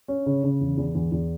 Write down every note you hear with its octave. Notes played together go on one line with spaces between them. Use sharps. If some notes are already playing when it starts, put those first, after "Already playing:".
C#4
C#3
C#3
E2
E2
E2
E2